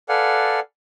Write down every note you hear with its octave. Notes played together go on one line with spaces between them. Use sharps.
A4 B4 D5 F5 F#5 G#5